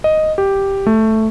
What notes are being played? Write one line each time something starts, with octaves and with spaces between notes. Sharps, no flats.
D#5
G4
A3